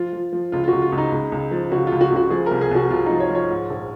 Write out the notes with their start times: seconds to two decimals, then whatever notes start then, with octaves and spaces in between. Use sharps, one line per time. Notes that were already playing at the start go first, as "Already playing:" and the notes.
Already playing: F3 F4
0.13 F3
0.33 F3
0.52 C#2 F4
0.64 F4
0.68 C#2 F#4
0.82 F4
0.92 C#2
0.98 D#4
1.12 C#2
1.32 C#2
1.51 F3
1.72 C#3 F#4
1.87 C#2 F4
2.01 F#4
2.12 C#2 F#4
2.30 F3 G#4
2.46 C2 A#4
2.61 G#4
2.71 C2 F#4
2.90 C2 F4
3.06 F3 D#4
3.20 C#5
3.30 F3
3.35 C#5
3.50 G#2
3.70 A#1